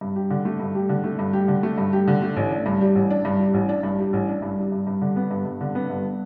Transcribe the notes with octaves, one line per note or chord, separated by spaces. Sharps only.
G2
G4
D3
A3
G2
G4
D3
A3
G2
G4
D3
A3
G2
G4
D3
A3
A1
D4
G2
G3
A1
D4
G2
G3
A1
D4
G2
G3
A1
D4
G2
G3
G2
G2
D3
B3
G2
G2
D3
B3
G2